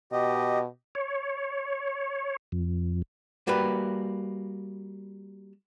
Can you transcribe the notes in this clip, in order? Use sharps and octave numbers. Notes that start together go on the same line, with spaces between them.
B2 G4 D#5
C#5
F2
G3 A#3 F#4 B4